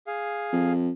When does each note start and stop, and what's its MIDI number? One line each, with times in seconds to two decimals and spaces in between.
0.07 0.73 68
0.07 0.73 77
0.53 0.90 41